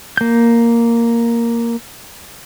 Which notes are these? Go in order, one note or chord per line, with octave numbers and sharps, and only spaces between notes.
A#3 G6